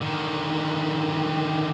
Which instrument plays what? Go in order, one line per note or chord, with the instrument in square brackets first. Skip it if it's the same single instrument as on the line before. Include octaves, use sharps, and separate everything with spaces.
[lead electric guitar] D3 D#3